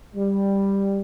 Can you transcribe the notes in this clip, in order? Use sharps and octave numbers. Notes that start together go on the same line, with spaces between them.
G3